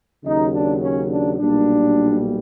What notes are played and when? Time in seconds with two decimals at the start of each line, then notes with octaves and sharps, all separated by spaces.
0.24 D#2 C#3 F#3 D#4
0.53 D4
0.81 C#4
1.09 D4
1.37 B1 A#2 G3 A#3 D4